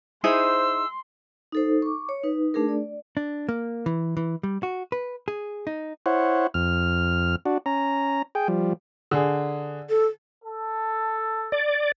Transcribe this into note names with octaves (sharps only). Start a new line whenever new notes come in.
D#4 E4 G#4 C5 C6 E6
D#4 A4 C5
C#6 D6
C#5
D#4 B4
A3 D4 G#4 A#4
D5
D4
A#3
E3
E3
G3
F#4
B4
G#4
D#4
E4 C5 C#5 F#5
F2 F6
D4 F#4
C#4 A#5
G#4 G5
F3 G3
D3 G#4
A4
A4
D5